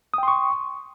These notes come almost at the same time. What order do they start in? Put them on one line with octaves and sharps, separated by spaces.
D#6 G5 C6 C#6